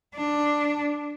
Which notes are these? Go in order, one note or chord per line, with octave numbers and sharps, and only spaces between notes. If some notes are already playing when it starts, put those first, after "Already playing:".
D4